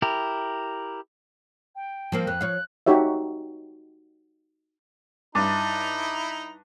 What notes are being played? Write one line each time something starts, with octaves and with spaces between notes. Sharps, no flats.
E4 G4 A#4
G5
F3 A#3 C4
F2 F#6
F3 C#5 F5
D#4 F#4 G4 C#5 E5
G2 D#4 E4 A5 A#5 D6